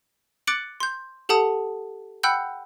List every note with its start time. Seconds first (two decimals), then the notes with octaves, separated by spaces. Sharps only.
0.47 D6 F#6 A6 C#7 D7 F#7
0.80 C6 G6
1.29 G4 A4 F#5 A5 D#6
2.23 F#5 G5 B5 E6 F#6 G6